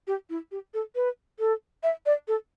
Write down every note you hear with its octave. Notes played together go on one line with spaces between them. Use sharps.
G4
E4
G4
A4
B4
A4
E5
D5
A4